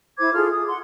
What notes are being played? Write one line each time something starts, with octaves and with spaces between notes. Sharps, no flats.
E4 C5 D6 G#6
F4 G#4 A4 F6
D#6
F#5 C6